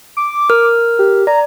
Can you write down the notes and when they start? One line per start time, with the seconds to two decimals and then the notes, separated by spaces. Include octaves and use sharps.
0.17 D6
0.50 A#4 F6
0.99 G4
1.27 D5 A#5